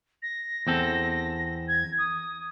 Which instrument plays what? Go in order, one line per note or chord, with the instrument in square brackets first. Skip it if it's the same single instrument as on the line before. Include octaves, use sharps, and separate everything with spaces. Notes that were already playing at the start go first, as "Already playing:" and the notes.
[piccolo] A#6
[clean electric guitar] E2 C4 A4
[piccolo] G#6
D#6